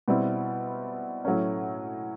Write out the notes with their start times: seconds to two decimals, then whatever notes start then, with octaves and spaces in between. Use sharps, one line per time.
0.08 B2 G3 C4 E4
1.25 A2 F#3 A3 C#4